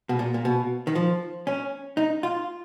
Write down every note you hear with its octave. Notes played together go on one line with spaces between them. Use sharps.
B2
A#2
A#2
B2
D#3
F3
C#4
D#4
F4